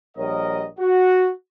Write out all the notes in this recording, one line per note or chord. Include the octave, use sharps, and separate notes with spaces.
A#1 G3 A#4 C#5 D#5
F#4